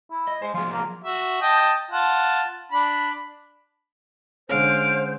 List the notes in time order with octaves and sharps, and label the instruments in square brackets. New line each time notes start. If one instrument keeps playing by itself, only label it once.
[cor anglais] E4
[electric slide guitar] D#5
[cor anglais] G#3 [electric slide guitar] C5
[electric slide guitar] F3 F#3 G#4 [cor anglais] F4
[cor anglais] A#3
[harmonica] F#4 E5
D#5 G5 A5
F4 F#5 A5
D4 B5
[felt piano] D3 G#3 C#4 [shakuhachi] C5 [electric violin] F5 D7